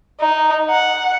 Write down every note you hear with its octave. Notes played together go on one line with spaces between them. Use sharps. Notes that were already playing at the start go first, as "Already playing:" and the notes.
D#4
F#5